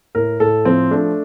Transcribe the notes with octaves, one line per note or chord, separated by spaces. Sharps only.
A2 A#4
A2 A4
F3 C4
A3 D4